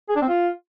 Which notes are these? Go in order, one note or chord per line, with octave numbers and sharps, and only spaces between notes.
G#4
D4
C4
F4